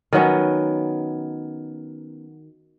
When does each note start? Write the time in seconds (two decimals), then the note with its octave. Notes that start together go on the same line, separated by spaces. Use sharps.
0.13 D#3 F#3 B3 C#4